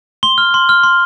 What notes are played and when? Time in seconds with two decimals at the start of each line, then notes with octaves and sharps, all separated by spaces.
0.23 C6 G7
0.38 F6
0.54 C6
0.69 F6
0.84 C6